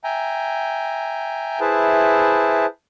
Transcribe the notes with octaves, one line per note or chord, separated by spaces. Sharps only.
E5 G5 G#5 A#5
E4 G#4 B4 C5 E5 A5